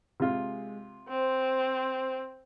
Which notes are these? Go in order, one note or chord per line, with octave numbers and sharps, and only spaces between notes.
C3 G#3 F4
C4 C5